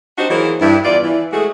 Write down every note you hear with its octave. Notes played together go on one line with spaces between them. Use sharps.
D4 D#4 F#4 G4 C5
E3 F#3 A#3 G#4 C5
G2 E4
E2 F4 D5
E3
G#3 A3 F#4 G#4